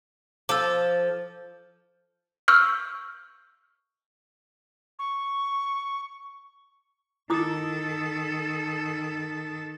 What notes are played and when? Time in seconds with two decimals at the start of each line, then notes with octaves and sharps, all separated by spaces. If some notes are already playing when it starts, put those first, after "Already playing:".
0.49 F3 A4 D6 E6
2.48 C#6 E6 F6 G6
4.99 C#6
7.30 D#3 E4 A4 D6 D#6